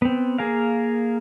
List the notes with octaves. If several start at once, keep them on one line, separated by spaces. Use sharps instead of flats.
B3 C4
A#3 G#4 A#4 F5